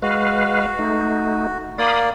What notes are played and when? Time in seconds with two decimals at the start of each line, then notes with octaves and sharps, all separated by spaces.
0.02 G#3 F#4 B4 F5
0.79 A3 D#4
1.78 A#3 D5 F5 B5 D#6